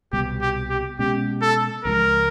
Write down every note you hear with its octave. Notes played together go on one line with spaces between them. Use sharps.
C2 B2 G3 G4
G4
G4
B2 G#3 C#4 G4
A4
C#2 C3 F3 G#3 A#4